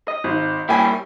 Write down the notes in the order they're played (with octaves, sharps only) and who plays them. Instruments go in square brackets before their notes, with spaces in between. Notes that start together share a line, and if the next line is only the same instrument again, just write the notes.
[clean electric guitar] D#5
[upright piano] G#1
[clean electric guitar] G3 A#3 E4 [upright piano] G5 G#5